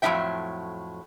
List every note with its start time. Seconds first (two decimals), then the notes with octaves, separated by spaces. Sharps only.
0.02 F2 A2 F#3 D4 E5 G5